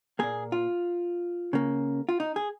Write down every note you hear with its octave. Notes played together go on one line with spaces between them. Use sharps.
A#2 A#3 G#4
F4
C#3 A#3
F4
D#4
G#4